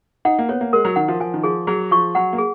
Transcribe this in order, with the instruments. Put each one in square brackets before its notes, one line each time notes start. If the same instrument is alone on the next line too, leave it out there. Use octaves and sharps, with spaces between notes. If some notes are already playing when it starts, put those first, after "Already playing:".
[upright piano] D#4 [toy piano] F#5
[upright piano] A#3
[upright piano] B3 [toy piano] C#5
[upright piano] A#3
[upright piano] G#3 [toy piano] A#4
[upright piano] F#3
[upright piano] D#3 [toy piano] F#5
[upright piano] F3
[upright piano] F3 [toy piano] G#5
[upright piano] D#3
[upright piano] F3 [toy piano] G#4
[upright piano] F#3 [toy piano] G#4
[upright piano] F3 [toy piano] C#6
[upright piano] F#3 [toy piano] F#5
[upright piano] A#3
[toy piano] G#4